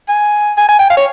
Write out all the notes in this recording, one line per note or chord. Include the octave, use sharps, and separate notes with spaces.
G#5
G#5
G#5
G5
F5
C#5